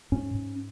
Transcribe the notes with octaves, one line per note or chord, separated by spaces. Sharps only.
G#2 C#4
G#2